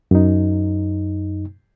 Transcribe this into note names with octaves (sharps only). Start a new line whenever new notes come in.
F#2 D#4